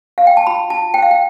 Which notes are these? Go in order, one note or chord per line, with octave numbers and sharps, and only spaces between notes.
F5
G5
A5
F4 B5
F4 A5
C5 G5
F5
G5